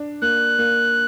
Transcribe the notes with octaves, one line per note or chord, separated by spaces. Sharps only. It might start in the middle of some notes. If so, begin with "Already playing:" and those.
Already playing: D4
A#3 F#6
A#3